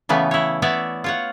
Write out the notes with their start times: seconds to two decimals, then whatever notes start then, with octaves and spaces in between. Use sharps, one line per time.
0.09 C#3 E3 A3 B3
0.31 E4 C#5
0.62 B3 E4 C#5 D5 E5
1.04 F4 C#5 F#5